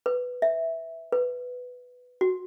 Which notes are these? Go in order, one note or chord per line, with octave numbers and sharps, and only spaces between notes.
B4
E5
B4
F#4